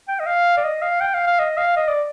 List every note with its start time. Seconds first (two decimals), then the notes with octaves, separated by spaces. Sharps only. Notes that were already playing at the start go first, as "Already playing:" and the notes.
0.08 G5
0.20 D#5
0.26 F5
0.57 D5
0.64 D#5
0.82 F5
1.01 G5
1.14 F5
1.27 F5
1.39 D#5
1.57 F5
1.77 D#5
1.88 D5